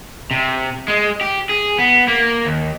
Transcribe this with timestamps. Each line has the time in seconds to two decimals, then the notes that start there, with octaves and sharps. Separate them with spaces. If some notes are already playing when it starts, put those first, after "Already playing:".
0.31 C3
0.88 G#3
1.21 G4
1.49 G#4
1.78 B3
2.08 A#3
2.45 D#2